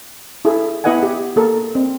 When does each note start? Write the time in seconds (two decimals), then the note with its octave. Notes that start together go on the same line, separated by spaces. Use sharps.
0.45 E4 G#4 A4
0.84 B3 E4 B4 D#5 F#5 G#5
1.03 G4
1.36 A#3 A4 A#4
1.75 C4